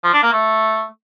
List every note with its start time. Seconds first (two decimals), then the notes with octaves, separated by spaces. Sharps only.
0.04 F3
0.13 D4
0.23 A#3
0.33 A3